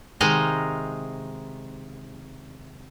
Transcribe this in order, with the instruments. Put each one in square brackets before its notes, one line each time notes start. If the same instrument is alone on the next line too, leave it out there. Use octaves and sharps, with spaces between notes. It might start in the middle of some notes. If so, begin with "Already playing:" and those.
[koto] C3 D#3 G#3 D#4 D#5 F5